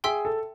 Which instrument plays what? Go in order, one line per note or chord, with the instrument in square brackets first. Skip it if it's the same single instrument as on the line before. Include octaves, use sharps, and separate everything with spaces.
[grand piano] G#4 [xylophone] E5 G5 C6 E6
[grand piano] A4